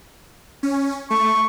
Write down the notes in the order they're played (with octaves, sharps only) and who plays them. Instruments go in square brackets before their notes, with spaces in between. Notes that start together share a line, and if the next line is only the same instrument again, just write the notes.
[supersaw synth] C#4
[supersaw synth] A3 [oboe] C#6